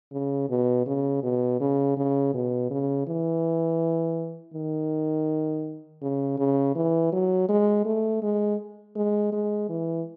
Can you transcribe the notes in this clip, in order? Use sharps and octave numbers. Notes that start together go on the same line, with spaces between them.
C#3
B2
C#3
B2
C#3
C#3
B2
C#3
E3
D#3
C#3
C#3
E3
F#3
G#3
A3
G#3
G#3
G#3
E3